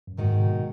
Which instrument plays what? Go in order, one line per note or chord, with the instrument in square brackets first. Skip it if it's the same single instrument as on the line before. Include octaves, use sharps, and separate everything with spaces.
[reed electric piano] F#2
[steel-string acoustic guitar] D#2 D#3 G#3 D#4 F#4 [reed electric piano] G#2
[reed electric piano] B2